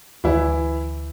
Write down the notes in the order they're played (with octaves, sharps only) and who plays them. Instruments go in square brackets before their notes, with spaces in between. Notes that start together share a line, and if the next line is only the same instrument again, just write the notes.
[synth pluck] D2 [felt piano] E3 E4